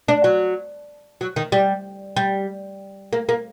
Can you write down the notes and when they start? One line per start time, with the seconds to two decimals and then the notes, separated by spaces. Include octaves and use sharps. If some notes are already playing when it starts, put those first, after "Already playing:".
0.08 D4
0.24 F#3
1.21 F#3
1.36 D#3
1.52 G3
2.16 G3
3.13 A#3
3.29 A#3